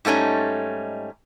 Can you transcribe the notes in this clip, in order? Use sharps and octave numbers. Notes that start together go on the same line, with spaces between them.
G#2 G3 A3 C#4 D#4